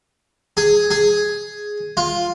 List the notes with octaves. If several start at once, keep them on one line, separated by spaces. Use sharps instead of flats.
G#4
G#4
F4